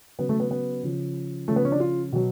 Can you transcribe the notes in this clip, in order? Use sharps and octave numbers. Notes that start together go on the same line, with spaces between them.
C#3 F#3 B3
A3
B3
B3
C#3 F3
C#3 F3 A3
B3
C#4
D4
F4
B2 F#3